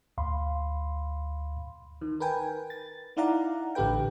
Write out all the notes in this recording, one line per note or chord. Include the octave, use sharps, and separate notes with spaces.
D2 F5 B5 C6
D#3
A#4 B4 G5 G#5
A6
D#4 E4 D5 F5 F#5 A#5
A1 D3 G4 A4 B4 G5